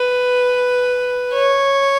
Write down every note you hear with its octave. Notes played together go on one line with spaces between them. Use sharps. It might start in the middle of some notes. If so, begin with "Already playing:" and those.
Already playing: B4
C#5